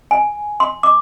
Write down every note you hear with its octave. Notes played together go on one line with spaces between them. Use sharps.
G#5
C6
D6